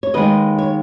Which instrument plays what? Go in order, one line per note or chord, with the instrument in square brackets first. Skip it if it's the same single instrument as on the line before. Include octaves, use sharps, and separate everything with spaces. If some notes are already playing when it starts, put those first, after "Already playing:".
[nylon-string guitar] C#5
D#2 D#3 G#3 B4 D#5
C#5